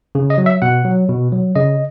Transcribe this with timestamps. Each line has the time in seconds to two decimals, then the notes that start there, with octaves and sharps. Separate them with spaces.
0.15 C#3
0.30 D#5
0.38 F#3
0.46 E5
0.62 B2 F#5
0.85 F#3
1.09 B2
1.32 F#3
1.56 C#3 D#5